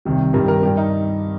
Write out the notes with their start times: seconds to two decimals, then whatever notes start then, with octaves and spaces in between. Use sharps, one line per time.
0.05 C2 C3 D#3 G3
0.34 G2 D#3 G3 A#4
0.48 A#4
0.63 G3 G4
0.66 G2
0.77 D#4